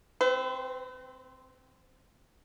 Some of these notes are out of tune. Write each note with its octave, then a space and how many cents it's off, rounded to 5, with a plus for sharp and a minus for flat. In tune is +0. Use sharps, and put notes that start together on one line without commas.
C4 +0 B4 +45